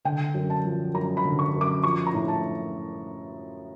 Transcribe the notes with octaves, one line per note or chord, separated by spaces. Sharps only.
D3 G5
F#2
A5
F3
F#2 A#5
B5
D3
C#6
F#2
D6
F3 C#6
A#5
A2
A5